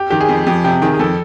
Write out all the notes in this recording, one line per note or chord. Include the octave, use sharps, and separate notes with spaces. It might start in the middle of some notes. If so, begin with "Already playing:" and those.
Already playing: G4
D#3 G4
G#4
F2
F2 G4
C3 G4
D#3 G#4
G#4
F2 A4